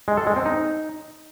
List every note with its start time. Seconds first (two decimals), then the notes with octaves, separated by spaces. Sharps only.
0.08 G#3
0.17 A4
0.27 G#3
0.36 C4
0.46 D#4